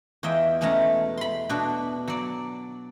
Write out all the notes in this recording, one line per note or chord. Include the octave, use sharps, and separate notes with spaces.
E2 F4 D#5 E5 G5
B2 G#3 A3 C#4 A5 A#5
B5 C6
B2 D4 F#4
F#3 D5